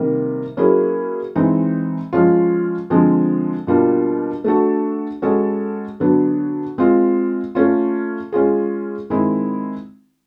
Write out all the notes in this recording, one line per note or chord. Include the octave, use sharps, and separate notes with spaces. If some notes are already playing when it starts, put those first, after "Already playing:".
Already playing: C3 D#3 G3 A#3
F#3 A#3 C#4 E4 G#4
E3 G#3 C4 D#4
F3 G#3 C#4 F4
D3 F3 G#3 C4
B2 G3 A#3 D4 F4
A3 D4 F#4 A4
G#3 C#4 F#4 A4
D3 F#3 B3 D4
G#3 C4 F4
A3 C#4 F4
G#3 C#4 F4 G#4
D#3 G#3 C4 E4